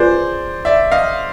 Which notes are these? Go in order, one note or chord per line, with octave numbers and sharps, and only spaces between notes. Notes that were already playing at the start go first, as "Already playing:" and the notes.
Already playing: F4 G#4 B4 C5 D5
D5 E5
D#5 F5